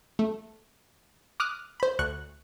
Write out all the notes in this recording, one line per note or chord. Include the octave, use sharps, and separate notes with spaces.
A3
D6 D#6 F6 F#6
C5 B5
D2 C#6 F#6